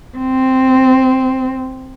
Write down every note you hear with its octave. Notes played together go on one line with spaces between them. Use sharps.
C4